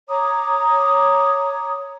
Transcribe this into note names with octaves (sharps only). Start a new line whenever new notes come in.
C#5 A#5 D6 D#6